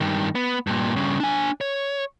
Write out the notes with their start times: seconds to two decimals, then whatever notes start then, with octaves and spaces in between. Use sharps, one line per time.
0.01 G2 D#3
0.35 B3
0.67 G2 A#2
0.96 G2 C#3
1.20 D4 G#5
1.61 C#5